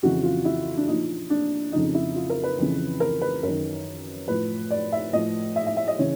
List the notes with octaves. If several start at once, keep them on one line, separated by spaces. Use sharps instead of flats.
F2 C#3 E3 F#4
F4
E4
D4
A#2 F3 D#4
D4
F2 C#3 F3 D#4
E4
F4
A#4
B4
F2 C#3 E3
A#4
B4
F#2 D#3 A#4
A2 F3 B4
D5
E5
A2 F3 D#5
E5
E5
E5
D#5
C#3 E3 C#5